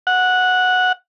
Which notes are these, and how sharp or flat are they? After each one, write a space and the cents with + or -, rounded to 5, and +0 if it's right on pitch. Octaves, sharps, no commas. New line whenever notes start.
F#5 -10